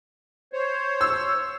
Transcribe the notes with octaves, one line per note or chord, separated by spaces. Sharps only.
C5 C#5
E6